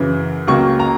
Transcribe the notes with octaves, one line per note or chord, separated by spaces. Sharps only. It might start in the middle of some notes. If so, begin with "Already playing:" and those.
Already playing: F#2 C#3 E3
C#2 C#3 F#3 A#3 C#6
A#5